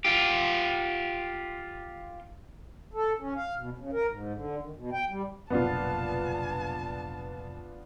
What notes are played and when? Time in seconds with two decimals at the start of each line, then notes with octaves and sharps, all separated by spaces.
0.05 F4 G4
2.94 A4
3.20 C#4
3.36 F5
3.58 B2
3.78 C#3
3.93 A#4
4.09 G#2
4.35 D3
4.63 D#3
4.76 B2
4.93 G5
5.10 G3
5.50 F1 B1 A#2 B3 D4 F4 A5